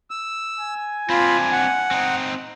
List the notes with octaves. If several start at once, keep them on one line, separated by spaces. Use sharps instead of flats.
E6
G#5
C4 D4 F4 B5
F#5
C4 D#4